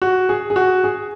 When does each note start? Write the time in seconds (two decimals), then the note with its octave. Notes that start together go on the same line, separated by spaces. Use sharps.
0.02 F#4
0.29 G#4
0.50 G#4
0.56 F#4
0.84 G#4